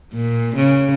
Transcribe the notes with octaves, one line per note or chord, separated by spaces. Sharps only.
A#2
C#3